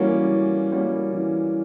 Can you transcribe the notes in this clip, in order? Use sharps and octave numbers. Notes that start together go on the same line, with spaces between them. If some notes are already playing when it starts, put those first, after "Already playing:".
Already playing: E3 G3 A#3 C#4 F#4
E3
G3 A#3 C#4 F#4
E3